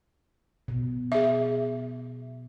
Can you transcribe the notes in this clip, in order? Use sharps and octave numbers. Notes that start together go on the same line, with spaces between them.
B2
G#4 E5